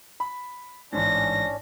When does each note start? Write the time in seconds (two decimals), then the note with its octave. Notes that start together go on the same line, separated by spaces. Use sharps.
0.20 B5
0.92 A1 G#2 C#4 D4 A#6